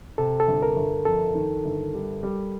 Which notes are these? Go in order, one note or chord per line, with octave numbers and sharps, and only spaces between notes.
C3 A4
A4
G1
A#4
G1
F2 A4
D#3
G1
G3
G3